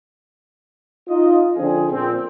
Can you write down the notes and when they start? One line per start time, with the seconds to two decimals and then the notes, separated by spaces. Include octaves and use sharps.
1.09 D#4 F4 D#5
1.57 D3 F3 C4 D4 G#4
1.91 A#2 C4